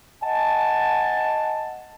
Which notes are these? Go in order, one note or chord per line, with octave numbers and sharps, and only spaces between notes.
D#5 F#5 G#5 A5